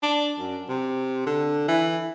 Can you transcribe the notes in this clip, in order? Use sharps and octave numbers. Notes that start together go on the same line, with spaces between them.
D4
F#2
C3
D3
E3